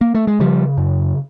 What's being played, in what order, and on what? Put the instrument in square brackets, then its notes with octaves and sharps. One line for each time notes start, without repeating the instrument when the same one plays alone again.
[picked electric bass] A#3
A3
G#3
C#3 F3 G3
F#2